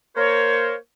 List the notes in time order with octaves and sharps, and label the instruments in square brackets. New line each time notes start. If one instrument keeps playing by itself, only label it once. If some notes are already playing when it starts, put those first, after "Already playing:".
[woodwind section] A#3 A#4 C5 C#5